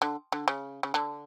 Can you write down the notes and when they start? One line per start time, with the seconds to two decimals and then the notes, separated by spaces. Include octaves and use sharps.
0.02 D3
0.32 D3
0.48 C#3
0.83 C#3
0.94 D3